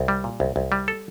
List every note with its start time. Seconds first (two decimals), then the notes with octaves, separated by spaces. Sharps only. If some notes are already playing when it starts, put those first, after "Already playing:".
Already playing: C2
0.08 G3
0.24 A#2
0.40 C2
0.56 C2
0.72 G3
0.88 A4